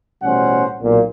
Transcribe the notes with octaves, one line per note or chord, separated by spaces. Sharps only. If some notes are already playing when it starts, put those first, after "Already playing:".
A1 B2 G3 C#4 C5 F#5
B1 A#2